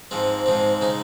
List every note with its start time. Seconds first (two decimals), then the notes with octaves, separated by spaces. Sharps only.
0.11 G#2 F3 G#3 C4
0.46 G#2 F3 G#3 C4
0.81 C#3 G#3 D#4